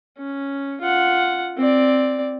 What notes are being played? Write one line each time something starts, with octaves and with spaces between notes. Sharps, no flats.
C#4
F4 F#5
C4 D5